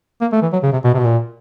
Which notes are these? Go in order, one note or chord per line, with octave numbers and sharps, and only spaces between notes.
A#3
A3
E3
F#3
C#3
C3
B2
C3
B2
A#2